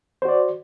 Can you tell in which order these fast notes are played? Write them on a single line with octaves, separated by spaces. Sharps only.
C5 F#4 D5